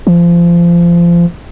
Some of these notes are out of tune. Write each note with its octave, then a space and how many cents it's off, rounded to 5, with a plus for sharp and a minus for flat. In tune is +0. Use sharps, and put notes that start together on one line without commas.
F3 -25